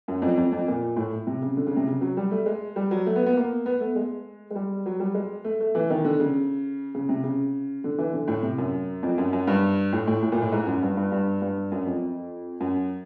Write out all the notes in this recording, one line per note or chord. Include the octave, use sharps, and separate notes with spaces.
F#2
F2
F2
F2
A#2
A2
C3
C#3
D3
C#3
C3
C#3
F#3
G3
A3
G#3
G3
F#3
A3
B3
B3
A#3
B3
A3
G#3
G#3
G3
F#3
G3
G#3
A3
A3
E3
D#3
D3
C#3
C#3
C3
C#3
D3
E3
D3
A2
C3
F#2
F2
F#2
F#2
G2
A2
A2
A2
A#2
A2
G#2
F#2
G2
G2
G2
G2
F#2
F2
F#2